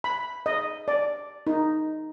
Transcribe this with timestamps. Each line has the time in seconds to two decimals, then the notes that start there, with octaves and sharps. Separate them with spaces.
0.04 B5
0.46 D#5
0.88 D5
1.47 D#4